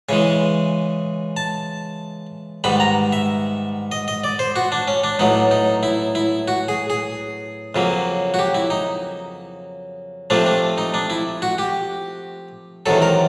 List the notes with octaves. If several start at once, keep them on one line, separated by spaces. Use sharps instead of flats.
C#3 E3 G#3 G#5
A5
G#2 D#3 G3 B3 B5
A#5
E5
D#5
D#5
D5
C5
F#4
D4
C#4
D4
A2 F#3 B3 D#4
D#4
E4
E4
F#4
G#4
G#4
F2 C#3 F#3 A#3
F#4
G4
E4
D#4
C3 F3 A3 C4 D4
D4
D#4
D4
E4
F#4
G4
E2 C3 D#3 F#3 A4
A#4